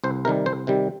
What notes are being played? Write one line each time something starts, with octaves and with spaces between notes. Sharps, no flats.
C2 C5
C3 D#3 G3 A#4
C2 C5
C3 D#3 G3